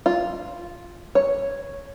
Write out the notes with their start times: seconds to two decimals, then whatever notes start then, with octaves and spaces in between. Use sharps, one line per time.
0.06 F4
1.15 C#5